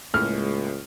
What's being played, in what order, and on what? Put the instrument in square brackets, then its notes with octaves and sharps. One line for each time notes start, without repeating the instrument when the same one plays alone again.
[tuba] C#2 [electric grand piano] A2 G#3 A#3 [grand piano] F6